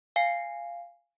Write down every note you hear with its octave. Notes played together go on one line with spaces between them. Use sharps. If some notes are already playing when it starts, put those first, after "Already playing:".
F5 G#5 C7